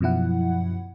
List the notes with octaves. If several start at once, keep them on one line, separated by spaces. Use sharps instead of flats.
F#2 B2 F3 E4 F#5